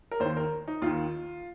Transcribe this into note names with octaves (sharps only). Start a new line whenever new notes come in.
A#4
D#2 D#3 C5
A#4
D#4
D#2 D#3 F4